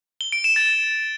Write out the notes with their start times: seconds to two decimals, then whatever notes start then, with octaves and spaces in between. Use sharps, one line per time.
0.21 G7
0.32 D7
0.44 E7
0.56 A6